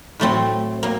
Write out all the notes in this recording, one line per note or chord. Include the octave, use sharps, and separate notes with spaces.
A2 F#3 A3 C4
F#3 A#3